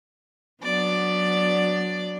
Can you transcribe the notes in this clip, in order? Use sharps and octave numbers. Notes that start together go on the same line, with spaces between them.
F#3 B3 D4 D5